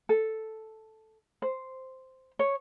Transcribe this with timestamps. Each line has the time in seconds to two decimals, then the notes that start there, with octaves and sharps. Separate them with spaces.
0.09 A4
1.42 C5
2.39 C#5